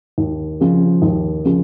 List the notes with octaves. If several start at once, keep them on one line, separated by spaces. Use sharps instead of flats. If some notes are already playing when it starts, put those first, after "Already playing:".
D#2
C#3 F3
D#2
C#3 F3